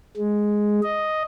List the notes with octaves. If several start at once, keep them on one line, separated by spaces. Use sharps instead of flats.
G#3
D#5